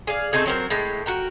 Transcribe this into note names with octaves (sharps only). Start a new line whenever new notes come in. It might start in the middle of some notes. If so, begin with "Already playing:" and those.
G#4 D5 F5
A3 C4 D#4 G#4
F#3 C4 A#4
A2 G#3 G5
F#4 A#4 G5